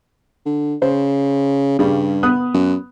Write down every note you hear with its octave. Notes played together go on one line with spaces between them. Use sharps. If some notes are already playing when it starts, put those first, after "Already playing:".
D3
C#3 C5
G2 C#3 G3
B3 D#6 F#6
F#2